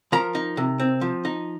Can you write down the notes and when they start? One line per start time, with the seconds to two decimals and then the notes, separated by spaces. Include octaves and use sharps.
0.12 F3 A#4 A#5
0.35 D#4
0.57 C3
0.80 C4
1.01 F3
1.25 D#4